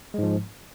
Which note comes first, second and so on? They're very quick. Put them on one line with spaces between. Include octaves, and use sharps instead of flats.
G#3 G#2 F3